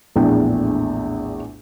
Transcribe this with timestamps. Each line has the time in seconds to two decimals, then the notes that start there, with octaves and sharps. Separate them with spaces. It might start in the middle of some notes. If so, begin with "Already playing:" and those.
0.16 A#1 E2 A2 D4 G5